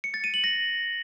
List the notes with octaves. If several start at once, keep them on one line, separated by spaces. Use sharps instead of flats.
C#7
A6
D#7
F#7
A#6